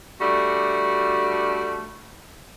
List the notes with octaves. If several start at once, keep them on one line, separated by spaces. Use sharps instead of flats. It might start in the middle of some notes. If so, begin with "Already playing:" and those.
G3 A3 D4 F#4